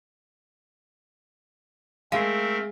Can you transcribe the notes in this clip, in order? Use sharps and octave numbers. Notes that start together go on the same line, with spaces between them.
G#3 A3 C4 A#4 F5